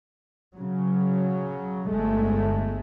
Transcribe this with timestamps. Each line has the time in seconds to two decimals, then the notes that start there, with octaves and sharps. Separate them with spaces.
0.56 C#3 F#3
1.89 G1 G#3 A3